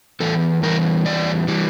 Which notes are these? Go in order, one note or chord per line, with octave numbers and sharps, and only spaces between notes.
E2 E3 A4
E2 E3 G3 A#4
E2 E3 G3 D5
E3 G3